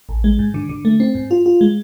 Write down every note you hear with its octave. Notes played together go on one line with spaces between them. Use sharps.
A1
G#3
G#2
D3
D3
A3
C4
G#2
F4
F4
G#3